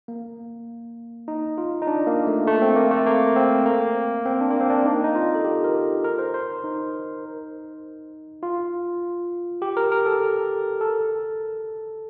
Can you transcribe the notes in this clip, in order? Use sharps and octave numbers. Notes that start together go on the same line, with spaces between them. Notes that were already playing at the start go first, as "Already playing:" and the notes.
A#3
D#4
F4
D#4
D4
A#3
A3
A3
C4
A#3
A3
A#3
C4
A#3
C4
D4
A#3
C4
D4
D#4
D#4
F4
A4
G4
A#4
A#4
C5
C5
D#4
F4
G4
A#4
A#4
A4
A4